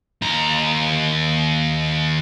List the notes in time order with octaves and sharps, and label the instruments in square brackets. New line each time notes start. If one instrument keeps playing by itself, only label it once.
[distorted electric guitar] D#2 A#5